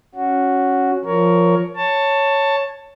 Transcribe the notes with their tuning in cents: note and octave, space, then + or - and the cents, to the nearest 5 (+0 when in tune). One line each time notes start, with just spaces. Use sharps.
C#4 +0 F#4 +0
F3 +0 A#4 +0 C#5 +15
C#5 +0 A5 +15